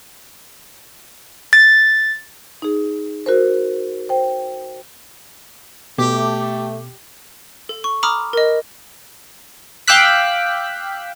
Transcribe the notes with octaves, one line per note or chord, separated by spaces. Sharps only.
A6
D#4 G#4
F#4 A#4 C5
C5 G5
B2 A3 G4
A4
C#6
A#5 B5 D6 D#6 F6
A#4 D#5
F5 G5 D6 E6 F#6 B6